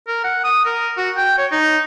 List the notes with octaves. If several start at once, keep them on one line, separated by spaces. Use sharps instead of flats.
A#4
F#5
D#6
A#4
F#4
G5
C#5
D#4